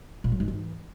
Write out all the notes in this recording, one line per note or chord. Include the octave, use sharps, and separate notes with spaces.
A#2
F#3
G#2
E3